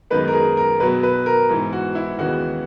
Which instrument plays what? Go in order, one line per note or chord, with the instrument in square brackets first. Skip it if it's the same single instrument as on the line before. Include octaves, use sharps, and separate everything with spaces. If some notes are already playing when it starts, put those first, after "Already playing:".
[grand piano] F#2 D#3 G#3 B3 B4
A#4
G#4
A#4
B2 F#3 B3 B4
B4
A#4
G#2 E3 B3
F#4
E4
D#2 C#3 E3 G#3 B3 F#4